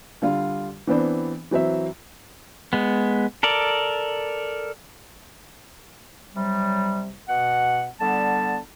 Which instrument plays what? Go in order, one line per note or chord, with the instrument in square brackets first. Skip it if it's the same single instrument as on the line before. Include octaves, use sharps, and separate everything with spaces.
[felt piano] D3 G3 F4
E3 B3 C4 D4
E3 F#3 C4 E5
[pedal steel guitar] G#3 B3
A4 A#4 D5
[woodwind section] C3 F#3 G3
B2 F#5
D3 G3 B3 A5